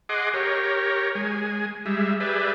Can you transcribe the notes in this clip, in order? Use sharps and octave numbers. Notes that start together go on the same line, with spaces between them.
G#4 D#5 F#5 C6 D6
G4 A#4 C#5
G#3 G#5
G3 G#3 E5
G4 G#4 B4 D5 E5